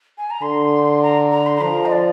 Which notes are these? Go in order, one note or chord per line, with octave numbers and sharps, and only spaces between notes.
G#5
A#5
D3 C6
A#5
A#5
C6
C6
F3 A#5
D#5
D5